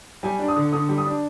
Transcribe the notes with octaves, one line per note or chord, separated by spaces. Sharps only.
G3 G#5
D4
D#6
D3
D3 D#6
G3
D#6
D4